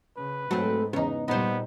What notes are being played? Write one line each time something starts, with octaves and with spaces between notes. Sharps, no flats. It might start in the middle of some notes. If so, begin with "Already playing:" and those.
C#3 B4
G#2 F#3 A3 C4
E2 C#3 B3 D#4
A#2 G3 B3 D#4 C5